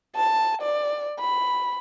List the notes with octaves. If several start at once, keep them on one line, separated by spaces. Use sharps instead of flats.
A5
D5
B5